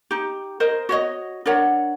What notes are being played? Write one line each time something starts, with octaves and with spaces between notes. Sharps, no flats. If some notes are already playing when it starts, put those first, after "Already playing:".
D#4 G4
A#4 C5 D#5
F#4 C#5 D#5
D4 A#4 C#5 F#5